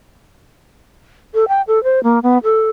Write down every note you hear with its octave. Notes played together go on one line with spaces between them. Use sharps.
A4
G5
A4
C5
A#3
B3
A4